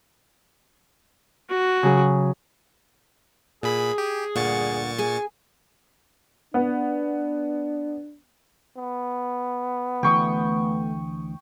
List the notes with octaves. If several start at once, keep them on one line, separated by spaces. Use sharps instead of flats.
F#4
C#3 F#3 G#4
A#2 G#4 B5
G4
D2 G2 A#2 F#5 C#6 A6
G#4 G#5
B3 D4
B3
D2 E3 A3 G5 C#6 D#6